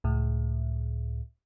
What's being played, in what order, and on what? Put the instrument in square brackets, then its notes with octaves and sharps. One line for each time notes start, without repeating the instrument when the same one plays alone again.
[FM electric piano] C#2 A2